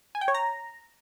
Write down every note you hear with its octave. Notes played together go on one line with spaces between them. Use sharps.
G#5
G5
C#5
A#5